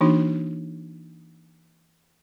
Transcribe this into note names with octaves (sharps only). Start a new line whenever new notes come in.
E3 A#3 D4 D#4 F#4